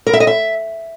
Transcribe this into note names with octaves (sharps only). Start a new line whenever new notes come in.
A#4
E5
D#5
E5